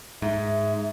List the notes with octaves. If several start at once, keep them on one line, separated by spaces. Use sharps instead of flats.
G#2 E5